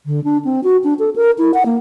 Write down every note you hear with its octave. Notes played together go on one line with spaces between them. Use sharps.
D3
D4
C4
F#4
D4
A4
A#4
E4
F#5
A#3